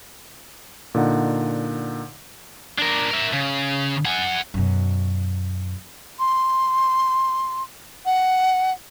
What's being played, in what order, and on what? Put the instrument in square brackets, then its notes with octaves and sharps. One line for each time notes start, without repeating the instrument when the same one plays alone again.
[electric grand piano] A#2 D3 D#4 F#5
[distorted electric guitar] D4 A#4
A#4 E5
C#3
F#5 G#5
[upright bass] F#2 B2
[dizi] C6
F#5